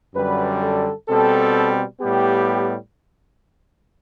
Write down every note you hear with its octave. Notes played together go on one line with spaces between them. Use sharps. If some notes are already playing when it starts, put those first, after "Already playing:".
F#2 D3 G3 B4
A4
B2 G3 C4 A4
A2 G3 B3 G4